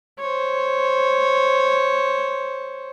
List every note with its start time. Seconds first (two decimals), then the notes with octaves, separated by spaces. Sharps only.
0.19 C5 C#5